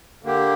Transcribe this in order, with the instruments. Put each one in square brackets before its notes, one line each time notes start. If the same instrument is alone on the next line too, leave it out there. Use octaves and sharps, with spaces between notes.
[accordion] D3 A#3 G4